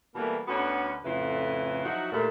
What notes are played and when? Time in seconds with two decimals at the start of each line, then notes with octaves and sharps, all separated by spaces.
0.15 B2 E3 G3 A3 A#3
0.48 D2 D3 B3 C#4 D4 F#4
1.05 F2 A2 C#3 E4 F4 B4
1.85 F3 F#3 D#4 E4 F#4
2.12 D#2 A#2 A3